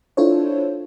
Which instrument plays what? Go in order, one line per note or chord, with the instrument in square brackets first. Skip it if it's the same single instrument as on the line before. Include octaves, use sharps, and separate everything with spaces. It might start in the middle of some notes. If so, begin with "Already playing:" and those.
[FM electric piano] D4 E4 F4 A4 C5 C#5